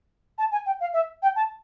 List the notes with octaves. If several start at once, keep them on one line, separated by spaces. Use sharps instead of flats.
A5
G#5
G5
F5
E5
G5
A5